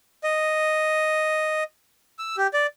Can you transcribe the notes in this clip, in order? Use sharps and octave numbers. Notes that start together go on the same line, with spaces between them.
D#5
E6
G4
D5